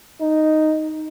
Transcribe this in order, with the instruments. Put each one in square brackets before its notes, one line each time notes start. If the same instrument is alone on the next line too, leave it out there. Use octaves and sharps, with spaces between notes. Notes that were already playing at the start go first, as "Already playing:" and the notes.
[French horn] D#4